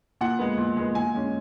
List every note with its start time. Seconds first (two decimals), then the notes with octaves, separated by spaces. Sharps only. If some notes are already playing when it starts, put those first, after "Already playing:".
0.21 A#2 F#5
0.39 G#3 B3
0.58 A#2
0.77 G#3 B3
0.95 A#2 G#5
1.15 G#3 C#4